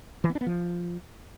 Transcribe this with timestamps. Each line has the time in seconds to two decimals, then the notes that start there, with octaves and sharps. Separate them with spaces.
0.24 E3
0.30 B3
0.35 D4
0.41 B3
0.46 F3